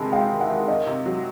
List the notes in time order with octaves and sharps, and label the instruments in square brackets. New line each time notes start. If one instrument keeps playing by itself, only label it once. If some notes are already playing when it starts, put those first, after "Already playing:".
Already playing: [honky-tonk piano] C3 D#3 G#3 [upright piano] A5 B5
[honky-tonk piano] G#3 [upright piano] F5 G5
[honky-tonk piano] D#3
[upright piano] E5 F#5
[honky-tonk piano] D#3
[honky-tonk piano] D#3 [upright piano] D#5 F5
[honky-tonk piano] C3
F#3